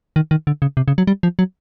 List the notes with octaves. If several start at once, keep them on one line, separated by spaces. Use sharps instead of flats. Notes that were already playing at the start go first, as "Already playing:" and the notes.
D#3
D#3
D3
C#3
C3
C#3
F#3
G3
F3
F#3